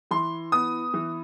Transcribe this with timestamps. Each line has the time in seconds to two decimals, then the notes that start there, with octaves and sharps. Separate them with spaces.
0.11 E3 C6
0.52 B3 D#6
0.94 E3